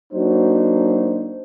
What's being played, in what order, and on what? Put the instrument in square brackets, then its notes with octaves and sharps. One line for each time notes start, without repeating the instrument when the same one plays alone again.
[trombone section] F#3 A#3 D4 D#4 F#4 C5